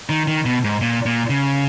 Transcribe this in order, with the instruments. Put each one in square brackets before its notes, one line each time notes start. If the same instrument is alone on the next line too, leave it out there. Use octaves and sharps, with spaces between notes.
[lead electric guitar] D#3
D#3
B2
G#2
A#2
A#2
C#3